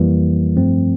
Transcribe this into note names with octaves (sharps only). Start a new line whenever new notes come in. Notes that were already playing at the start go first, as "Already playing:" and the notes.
Already playing: F2 E3 G3 A#3
G2 F3 A3 C4